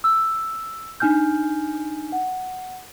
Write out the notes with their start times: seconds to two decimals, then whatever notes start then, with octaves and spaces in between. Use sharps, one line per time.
0.04 E6
1.00 D4 D#4 G#5 F6 G6
2.12 F#5